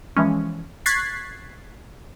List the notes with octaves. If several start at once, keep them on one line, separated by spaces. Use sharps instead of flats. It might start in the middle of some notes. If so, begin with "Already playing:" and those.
E3 F3 G#3 C#4
C#6 F#6 G#6 A6 B6 C7